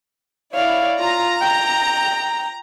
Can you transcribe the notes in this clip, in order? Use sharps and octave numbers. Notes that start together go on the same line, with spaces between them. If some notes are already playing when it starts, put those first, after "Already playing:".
E4 C#5 D5 F5
F4 A#5
G5